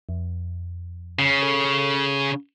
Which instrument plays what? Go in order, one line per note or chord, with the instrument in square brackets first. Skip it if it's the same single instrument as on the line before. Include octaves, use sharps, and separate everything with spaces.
[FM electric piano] F2
[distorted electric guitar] C#3
[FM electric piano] A4